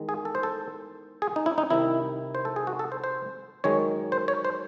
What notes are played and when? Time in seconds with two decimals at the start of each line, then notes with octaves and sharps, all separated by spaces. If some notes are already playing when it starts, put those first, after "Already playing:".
Already playing: E2 D#3 G#3
0.09 G#4
0.25 A4
0.35 C5
0.43 A4
1.22 G#4
1.36 D#4
1.46 E4
1.58 D#4
1.70 C2 C3 D#3 E4
2.35 C5
2.45 A4
2.56 G#4
2.67 F#4
2.79 A4
2.92 C5
3.04 C5
3.64 F#2 D#3 G#3 C#5
4.12 C5
4.28 C#5
4.45 C5